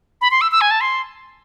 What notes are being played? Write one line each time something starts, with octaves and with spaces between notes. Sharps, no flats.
B5
C6
E6
E6
G#5
A5
C6